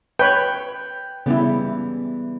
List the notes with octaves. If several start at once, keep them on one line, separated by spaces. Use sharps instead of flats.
B4 C#5 G5
C#3 E3 G3 B3 E4